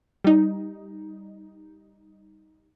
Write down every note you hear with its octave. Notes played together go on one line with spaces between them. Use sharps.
G3 D#4